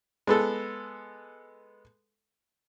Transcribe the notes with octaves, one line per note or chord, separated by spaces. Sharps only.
G#3 B3 A4